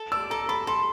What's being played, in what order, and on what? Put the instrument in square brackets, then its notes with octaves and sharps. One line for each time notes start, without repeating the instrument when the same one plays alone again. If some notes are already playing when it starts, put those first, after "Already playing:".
Already playing: [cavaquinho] A4
[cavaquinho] D5 [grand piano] E6
[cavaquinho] A4 [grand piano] A#5
[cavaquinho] A4 [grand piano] B5
[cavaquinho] A4 [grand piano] C6